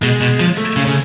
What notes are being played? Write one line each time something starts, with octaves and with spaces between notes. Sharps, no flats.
B2 G#3
B2
F3
A3
C#3
C#3